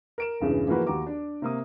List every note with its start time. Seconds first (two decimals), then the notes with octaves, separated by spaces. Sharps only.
0.18 A#4 D7 E7
0.40 E1 G2 C#3 E3 C#4
0.67 E3 F3 G#3 A#3 F#4 B4
0.87 D#2 F#4 G4 A#5 D6
1.07 D4
1.42 C3 A#3 D#6